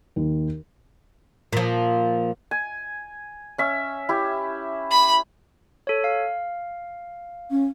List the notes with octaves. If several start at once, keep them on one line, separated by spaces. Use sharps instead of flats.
D#2
A#2 F3
G#5
C#4 E5
E4 G4
B5
A4 C#5
F5
C#4